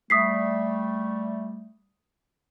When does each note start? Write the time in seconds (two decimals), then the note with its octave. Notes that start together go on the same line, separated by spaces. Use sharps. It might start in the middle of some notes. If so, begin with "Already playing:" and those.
0.10 G3 A3 D#6 B6 C7